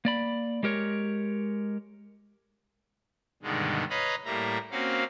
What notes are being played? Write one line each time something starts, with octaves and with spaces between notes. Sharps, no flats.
A#3 D5 B5
G#3 G4 A#4 C#5
G2 B2 D3 D#3 G#3
B4 C#5 D#5 F5 A#5 B5
A2 G3 A#3 E5 A#5
A#3 C4 C#4 F#4 F5